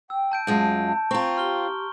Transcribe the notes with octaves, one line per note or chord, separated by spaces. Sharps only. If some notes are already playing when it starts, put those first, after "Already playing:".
G5 E6
A5 G6 D7
F#2 G#3 F4 A5 G6
C4 F4 A#5 C#6
G4 C6 F6 G7